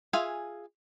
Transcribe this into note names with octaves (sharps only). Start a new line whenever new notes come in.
F4 G#4 E5 F5 G#5